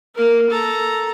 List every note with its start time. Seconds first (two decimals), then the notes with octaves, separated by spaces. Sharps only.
0.15 A#3 A#4
0.50 A4 A#5